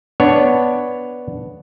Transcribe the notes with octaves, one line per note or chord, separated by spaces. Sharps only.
B3 D4 C#5